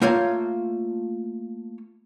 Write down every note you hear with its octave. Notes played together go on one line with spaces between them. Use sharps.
A3 A#3 F4 C#5 F5